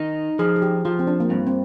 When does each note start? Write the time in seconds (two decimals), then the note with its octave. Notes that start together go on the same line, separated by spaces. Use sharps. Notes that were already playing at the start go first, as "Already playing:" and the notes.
Already playing: D#3 D#4
0.39 F3 G#4
0.56 G#4
0.62 G4
0.85 F3 F4
0.99 C4
1.07 D4
1.20 A#3
1.30 G2 C4
1.47 C4